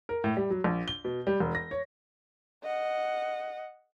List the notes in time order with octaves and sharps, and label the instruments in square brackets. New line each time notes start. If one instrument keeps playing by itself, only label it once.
[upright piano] A#4
A2
G3
F#3
A#1
G7
B2
G3
E1
A#6
C#5
[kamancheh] D#5 F#5